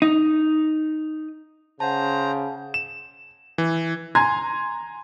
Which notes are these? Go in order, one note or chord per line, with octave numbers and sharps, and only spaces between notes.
D#4
C#3 C5 F#5 A5 A#5
E7
E3
G#5 A#5 C6 G#6